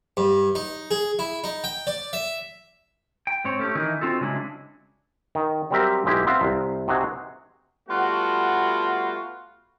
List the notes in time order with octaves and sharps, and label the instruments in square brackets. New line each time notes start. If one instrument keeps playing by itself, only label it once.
[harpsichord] G2
D#4
G#4
E4
D#4
G5
D5
E5
[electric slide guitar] G5
G#2 C4 C#5
A3 C#4 E4 G4
D#3 E3 D#4 E4 A#4
C4 F4 F#4 A4
C#3 F#3 G#3 D4 E4
[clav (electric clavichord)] D#3
F#3 G3 C4 G4 A#4 E5
B1 G#3 E4 G4
B3 C4 C5 E5 F5 G5
C2
C3 D#4 F#4 G#4
[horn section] G3 A3 B3 F4 F#4